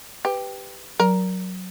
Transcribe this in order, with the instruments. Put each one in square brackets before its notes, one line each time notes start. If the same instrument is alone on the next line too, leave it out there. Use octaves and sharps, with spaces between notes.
[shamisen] G4 [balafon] B4
[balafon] F#3 [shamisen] A#4